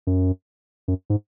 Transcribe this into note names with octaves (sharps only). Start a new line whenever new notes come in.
F#2
F#2
G#2